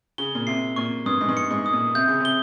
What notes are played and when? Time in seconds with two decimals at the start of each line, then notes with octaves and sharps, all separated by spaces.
0.18 C#3 G7
0.35 A#2
0.47 C3 C7
0.76 A#2 C#6
1.06 G2 D#6
1.21 G#2
1.29 G2
1.37 C#7
1.51 G#2
1.66 D#6
1.73 A#2
1.95 C3 G6
2.07 C#3
2.20 C3 G7